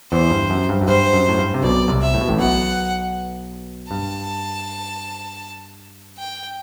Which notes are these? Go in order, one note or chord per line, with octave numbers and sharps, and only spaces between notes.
E2 E3 C5
G2
F#2
G2
F#2
G2 C5
F#2
A2
G2
C3
B1 B2 D5
C2 C3
E5
A2
B2
A1 A2
B1 B2 F#5
G2 A5
G5